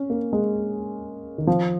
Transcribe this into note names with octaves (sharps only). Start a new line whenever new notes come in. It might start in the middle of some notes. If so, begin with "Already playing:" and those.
Already playing: C#4
A#3
G#3
D#3
F3